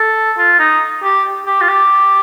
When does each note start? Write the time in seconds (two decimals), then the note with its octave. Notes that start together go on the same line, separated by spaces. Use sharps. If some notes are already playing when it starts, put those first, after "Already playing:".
Already playing: A4
0.38 F4
0.59 D#4
1.03 G4
1.46 G4
1.61 F4
1.68 G4